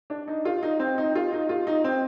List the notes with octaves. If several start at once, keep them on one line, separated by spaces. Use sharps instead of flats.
D4
D#4
F4
D#4
C4
D#4
F4
D#4
F4
D#4
C4